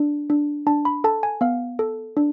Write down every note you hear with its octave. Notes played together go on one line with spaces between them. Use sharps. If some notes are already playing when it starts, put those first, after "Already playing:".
Already playing: D4
D4
D4 A5
B5
A4 A5
G#5
B3 F5
A4
D4